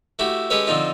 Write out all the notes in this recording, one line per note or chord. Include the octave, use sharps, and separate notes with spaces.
A3 E4 F#4 G4
G#3 C#4 G4 A4 B4 C#5
D3 F3 C4 D#4 F4